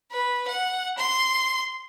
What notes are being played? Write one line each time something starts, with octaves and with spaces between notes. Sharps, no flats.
B4
F#5
C6